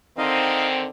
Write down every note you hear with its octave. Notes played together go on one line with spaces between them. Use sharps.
D3 D#3 C4 D#4 D#5 F5